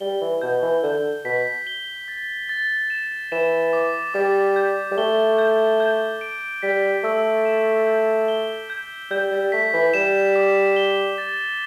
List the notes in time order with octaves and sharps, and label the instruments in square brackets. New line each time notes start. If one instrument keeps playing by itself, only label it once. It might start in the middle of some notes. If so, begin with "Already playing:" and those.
[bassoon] G3 [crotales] G7
[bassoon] E3
[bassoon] B2 [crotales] G6
[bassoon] E3
[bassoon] D3 [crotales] G6
[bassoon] B2 [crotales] B6
[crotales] G7
A6
A6
E7
[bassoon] E3 [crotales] E7
[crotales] D6
[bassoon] G3 [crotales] D6
[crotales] G6
[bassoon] G3
[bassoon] A3 [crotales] G7
[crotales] G6
G6
D7
[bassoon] G3 [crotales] B6
[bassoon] A3 [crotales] E6
[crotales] E7
G6
G7
G6
[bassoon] G3 [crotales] G6
[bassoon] G3
[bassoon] A3 [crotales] B6
[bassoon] E3
[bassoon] G3 [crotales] E7
[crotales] D6
G7
A6